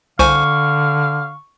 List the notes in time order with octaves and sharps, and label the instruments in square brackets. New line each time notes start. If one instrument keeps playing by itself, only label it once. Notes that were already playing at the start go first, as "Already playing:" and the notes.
[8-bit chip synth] C2 C5 G#5 [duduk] D3 [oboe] F5 [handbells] C#6